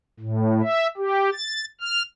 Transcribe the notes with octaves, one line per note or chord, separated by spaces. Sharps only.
A2
E5
G4
A6
F6